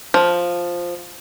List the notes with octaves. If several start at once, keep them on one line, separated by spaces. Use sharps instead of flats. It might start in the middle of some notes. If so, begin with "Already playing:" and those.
F3